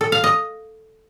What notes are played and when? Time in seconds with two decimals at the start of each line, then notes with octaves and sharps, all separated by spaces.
0.01 A4
0.12 F5
0.24 D#5